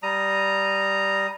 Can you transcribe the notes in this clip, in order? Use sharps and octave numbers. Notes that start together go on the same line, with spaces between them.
G3 A#5 D#6